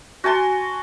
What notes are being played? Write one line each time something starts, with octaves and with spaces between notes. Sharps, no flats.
F#4 G#5 A5 C6